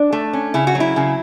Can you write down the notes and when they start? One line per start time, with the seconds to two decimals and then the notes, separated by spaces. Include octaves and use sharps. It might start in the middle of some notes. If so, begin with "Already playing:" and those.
Already playing: D4
0.12 A3
0.33 C#4
0.54 C#3 E4
0.67 F#4
0.75 F#3
0.80 E4
0.96 C#3